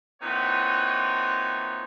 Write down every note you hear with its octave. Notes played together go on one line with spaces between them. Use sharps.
A#2 E3 C4 D#4 C#5 F#5